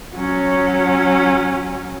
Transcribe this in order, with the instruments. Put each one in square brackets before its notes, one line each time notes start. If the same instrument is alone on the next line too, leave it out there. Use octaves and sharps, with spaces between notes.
[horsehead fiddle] F#3 C#4